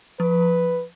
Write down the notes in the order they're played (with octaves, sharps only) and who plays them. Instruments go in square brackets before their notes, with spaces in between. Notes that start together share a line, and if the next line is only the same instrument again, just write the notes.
[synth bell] F3 [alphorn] B4